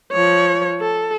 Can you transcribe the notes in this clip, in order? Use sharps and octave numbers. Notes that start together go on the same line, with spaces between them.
F3 C#5
A4